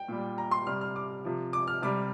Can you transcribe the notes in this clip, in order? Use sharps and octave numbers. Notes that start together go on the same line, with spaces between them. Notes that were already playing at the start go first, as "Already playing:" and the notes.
Already playing: G5
A#2 G3
A#5
C6
C3 G3 F6
F6
D6
C3 F3
D6
F6
C3 G3 D6